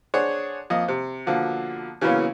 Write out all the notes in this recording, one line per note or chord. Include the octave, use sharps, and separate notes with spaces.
D4 G#4 C5 C#5 F#5
F2 A#3 D#5
C3
B2 D3 F3 A#3
C#3 E3 F#3 A#3 B3 C#4